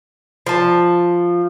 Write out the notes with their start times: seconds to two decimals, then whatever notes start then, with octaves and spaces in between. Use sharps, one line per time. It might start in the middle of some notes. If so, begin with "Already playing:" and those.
0.46 F3 A5